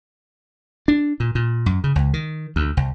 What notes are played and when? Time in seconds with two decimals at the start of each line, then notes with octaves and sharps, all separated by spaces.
0.88 D4
1.20 A#2
1.35 A#2
1.66 F#2
1.84 C#3
1.96 C#2
2.14 D#3
2.56 D2
2.77 C2